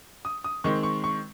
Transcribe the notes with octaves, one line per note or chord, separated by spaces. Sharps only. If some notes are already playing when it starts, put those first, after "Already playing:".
D#6
D#6
D#3 G#3 C4 C#6
C#6
C#6